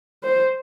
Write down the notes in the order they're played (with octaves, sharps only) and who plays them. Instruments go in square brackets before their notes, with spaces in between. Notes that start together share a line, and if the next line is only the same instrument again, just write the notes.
[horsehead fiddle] C5